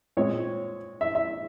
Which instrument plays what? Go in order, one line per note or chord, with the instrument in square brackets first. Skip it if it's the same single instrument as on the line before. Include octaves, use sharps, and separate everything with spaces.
[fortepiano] A#2 G#3 C4 C#5
E5
E5